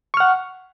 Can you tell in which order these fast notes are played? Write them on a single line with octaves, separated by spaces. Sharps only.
C#6 F6 F#5